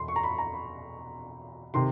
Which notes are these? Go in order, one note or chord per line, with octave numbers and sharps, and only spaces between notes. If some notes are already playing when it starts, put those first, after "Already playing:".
Already playing: E2 B2 B5 C6
C#6
A#5
B5
A#5
B5
C3 D#3 C6